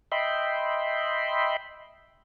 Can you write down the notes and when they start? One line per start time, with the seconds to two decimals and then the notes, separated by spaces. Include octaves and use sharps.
0.12 D#5 E5 G5 B5 C6